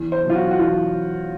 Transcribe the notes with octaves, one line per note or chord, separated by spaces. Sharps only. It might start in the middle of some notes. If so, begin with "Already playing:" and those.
Already playing: E2
C5
B2 F#3
F4
F#4
F#4
E2 F4